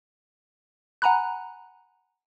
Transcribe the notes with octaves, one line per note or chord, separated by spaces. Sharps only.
F#5 G#5 A#5 B5 F#6